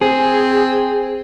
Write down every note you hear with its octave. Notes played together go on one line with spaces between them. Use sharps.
C4 G#4